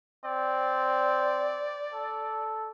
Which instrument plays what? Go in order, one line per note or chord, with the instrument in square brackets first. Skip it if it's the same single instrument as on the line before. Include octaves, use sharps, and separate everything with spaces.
[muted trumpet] C4 [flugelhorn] D5
[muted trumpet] A4